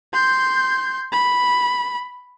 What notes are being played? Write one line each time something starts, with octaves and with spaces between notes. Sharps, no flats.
C6 G6
B5